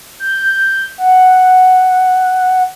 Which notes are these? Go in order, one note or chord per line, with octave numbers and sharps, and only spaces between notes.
G6
F#5